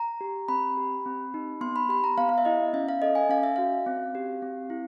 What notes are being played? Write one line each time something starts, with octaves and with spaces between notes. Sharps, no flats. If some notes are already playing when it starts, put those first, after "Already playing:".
Already playing: A#5
G4
C4 B5
G4
C4
D#4
B3 C6
B5
G4 B5
A#5
B3 F5
F5
E5
E4 D#5
C#4 E5
F5
A4 D#5
G#5
C#4 F5
E5
F#4 F5
C4
G4
C4
E4